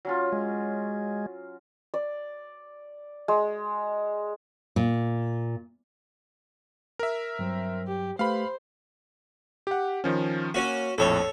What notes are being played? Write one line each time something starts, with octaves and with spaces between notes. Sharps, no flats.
F#3 C#4 F4
G#3
D5
G#3
A#2
A#4 E5
G2 F#3 C4
G4
A3 G4 B4 C5 F5 B5
G4 F#5
D#3 F3 C#4
A#3 C#4 F#4
A#1 F2 A2 A4 C#5